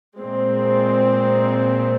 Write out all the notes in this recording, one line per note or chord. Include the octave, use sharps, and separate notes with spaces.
A#2 G#3 C4